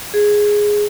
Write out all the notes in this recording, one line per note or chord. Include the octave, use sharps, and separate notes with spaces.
G#4